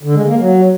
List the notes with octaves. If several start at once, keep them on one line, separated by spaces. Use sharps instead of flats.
D3
G#3
A#3
F#3